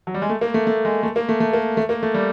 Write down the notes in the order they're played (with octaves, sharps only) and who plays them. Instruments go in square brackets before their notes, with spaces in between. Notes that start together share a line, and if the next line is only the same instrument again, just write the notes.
[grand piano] F#3
G3
G#3
A3
A#3
A3
A3
G#3
A3
A#3
A3
A3
A#3
A3
A#3
A3
G3